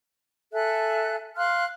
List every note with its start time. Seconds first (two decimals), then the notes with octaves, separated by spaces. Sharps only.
0.53 A4 E5 G#5 F#6
1.36 F5 C6 F6 F#6